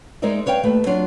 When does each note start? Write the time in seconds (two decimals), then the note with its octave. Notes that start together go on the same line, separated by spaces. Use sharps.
0.22 G#3 D#4 A#4 C5 D5 E5
0.46 B4 C#5 D5 F5 G5
0.63 D#2 A3 B4
0.86 F#3 D4 F4